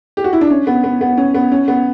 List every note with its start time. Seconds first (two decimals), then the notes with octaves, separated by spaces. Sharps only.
0.17 G4
0.24 F#4
0.33 E4
0.41 D4
0.50 C#4
0.67 B3
0.84 B3
1.01 B3
1.17 C#4
1.35 B3
1.52 C#4
1.68 B3